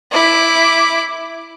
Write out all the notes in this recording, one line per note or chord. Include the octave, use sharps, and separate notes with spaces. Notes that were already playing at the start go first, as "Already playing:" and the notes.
E4 D6